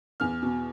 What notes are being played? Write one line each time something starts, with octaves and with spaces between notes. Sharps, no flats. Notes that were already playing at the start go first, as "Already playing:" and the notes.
E2 F6
B2